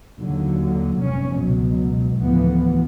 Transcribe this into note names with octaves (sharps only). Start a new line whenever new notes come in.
D#2 D3 F#3
F1 G2 C#4
C#2 B2 F#3
D2 A2 E3 F3 B3